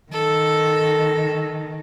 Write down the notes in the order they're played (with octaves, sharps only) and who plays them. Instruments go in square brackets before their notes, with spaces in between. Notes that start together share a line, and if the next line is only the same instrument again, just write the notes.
[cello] D#3 [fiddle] A4